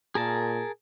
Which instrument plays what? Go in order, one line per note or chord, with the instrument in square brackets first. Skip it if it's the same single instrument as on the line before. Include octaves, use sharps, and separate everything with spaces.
[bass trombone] A#2 [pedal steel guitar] G#4 A#4 A5